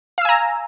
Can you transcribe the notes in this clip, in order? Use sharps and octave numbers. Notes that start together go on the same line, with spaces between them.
F5 G#5 A#5 E6